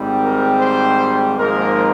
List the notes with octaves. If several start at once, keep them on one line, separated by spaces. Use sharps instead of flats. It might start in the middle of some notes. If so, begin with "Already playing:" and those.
Already playing: G#1 G#2 G3 C4
A#4
C5
G#1 G#2 F3 A#3 A#4